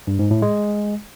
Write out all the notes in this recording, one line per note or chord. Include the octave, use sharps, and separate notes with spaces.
G2
G#2
A2
G#3